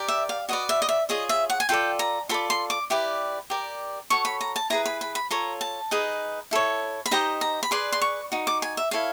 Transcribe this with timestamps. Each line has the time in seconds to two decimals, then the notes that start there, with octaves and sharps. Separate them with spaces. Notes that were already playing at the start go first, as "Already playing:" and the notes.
Already playing: G4 A#4 D5
0.08 E5
0.29 F5
0.49 F#4 B4 D5 D#5
0.69 E5
0.82 D#5
0.89 E5
1.09 F4 G#4 C#5 D#5
1.29 E5
1.50 F#5
1.60 G#5
1.69 F4 A4 D5 G5
1.99 A#5
2.29 F4 A4 D5 B5
2.50 C6
2.70 D6
2.90 E4 G4 B4 D5
3.50 G4 A#4 D5
4.10 F#4 A4 C#5 C#6
4.25 B5
4.41 A#5
4.56 A5
4.70 E4 G#4 B4 A#5
4.86 B5
5.01 B5
5.15 B5
5.30 F4 A4 C#5 A#5
5.61 A5
5.91 D#4 G#4 B4 D#5
6.51 E4 A4 C#5
7.06 B5
7.11 D#4 G4 C5 D#5 A#5
7.41 A#5
7.63 B5
7.71 G#4 B4 D5 C6
7.92 C6
8.02 C#6
8.32 D#4 F#4
8.47 D6
8.62 G#5
8.77 E5
8.91 E4 A4 C#5 F5